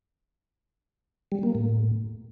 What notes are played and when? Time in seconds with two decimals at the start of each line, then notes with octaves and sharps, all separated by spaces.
1.32 G3
1.43 A#3
1.55 A2